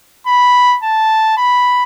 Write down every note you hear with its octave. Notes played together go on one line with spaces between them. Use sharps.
B5
A5
B5